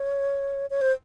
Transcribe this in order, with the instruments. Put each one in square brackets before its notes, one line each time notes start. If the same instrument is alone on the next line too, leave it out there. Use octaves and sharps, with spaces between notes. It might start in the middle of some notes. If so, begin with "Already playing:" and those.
Already playing: [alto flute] C#5
C#5
C5